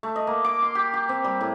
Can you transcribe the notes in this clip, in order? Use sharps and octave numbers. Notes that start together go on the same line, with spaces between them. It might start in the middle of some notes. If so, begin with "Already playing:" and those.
A3
D#5
A#3
D6
C6
G4
G4
C4
G3
A2